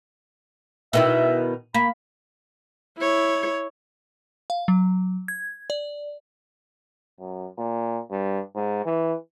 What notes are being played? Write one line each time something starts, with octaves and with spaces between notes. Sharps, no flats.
B2 D#3 E4 E5
A#3 B5
E4 C#5
F5
F#3
G#6
D5
F#2
A#2
G2
G#2
E3